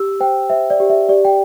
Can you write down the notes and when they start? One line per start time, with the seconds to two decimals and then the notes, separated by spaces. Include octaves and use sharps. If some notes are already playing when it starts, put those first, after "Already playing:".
Already playing: G4 E6
0.20 C5 G5
0.50 C5 E5
0.70 D5
0.80 G4
0.89 E5
1.09 G4 D5
1.25 G5